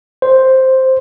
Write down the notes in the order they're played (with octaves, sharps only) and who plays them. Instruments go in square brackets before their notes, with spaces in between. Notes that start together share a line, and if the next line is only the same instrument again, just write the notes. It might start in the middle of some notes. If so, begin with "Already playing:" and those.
[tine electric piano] C5